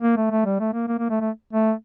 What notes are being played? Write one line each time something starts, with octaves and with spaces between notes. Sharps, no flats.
A#3
A3
A3
G3
A3
A#3
A#3
A#3
A3
A3
A3